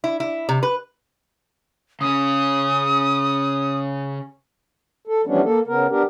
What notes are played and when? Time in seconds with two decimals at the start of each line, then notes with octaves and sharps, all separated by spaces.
0.04 E4
0.20 E4
0.49 C3
0.63 B4
2.01 C#3 C#4 D#6
5.07 A4
5.27 E3 F3 G3 B3 C#4 D4
5.44 A#3 A4
5.67 C#3 B3 A#4
5.90 B3 D4 G4 A#4